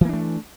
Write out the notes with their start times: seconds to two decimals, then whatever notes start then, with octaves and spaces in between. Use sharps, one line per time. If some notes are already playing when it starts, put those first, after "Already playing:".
0.01 E3
0.05 A#3
0.09 D4
0.13 A3